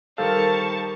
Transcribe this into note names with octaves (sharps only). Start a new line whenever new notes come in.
D#3 G3 A4 A#4 C5 F5 A5 C#6